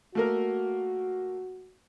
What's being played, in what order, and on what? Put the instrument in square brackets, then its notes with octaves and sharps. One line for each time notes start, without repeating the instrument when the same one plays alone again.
[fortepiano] A3 A#3 A#4 [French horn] F#4